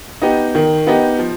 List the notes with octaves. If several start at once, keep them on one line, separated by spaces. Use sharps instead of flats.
B3 D#4 G4
D#3
B3 D#4 G4
F3